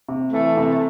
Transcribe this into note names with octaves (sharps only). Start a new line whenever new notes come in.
C3
E3 A3
C3